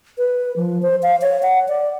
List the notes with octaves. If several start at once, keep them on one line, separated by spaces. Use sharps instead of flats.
B4
F3
C5
F5
C#5
F#5
D5